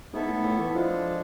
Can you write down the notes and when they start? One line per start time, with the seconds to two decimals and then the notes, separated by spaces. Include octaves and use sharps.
0.13 G#2 B3 E4 A4 E5
0.28 A2
0.43 A2
0.59 E3
0.74 F3 G#3 D4 A4